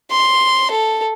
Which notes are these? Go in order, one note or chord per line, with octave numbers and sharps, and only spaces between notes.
C6
A4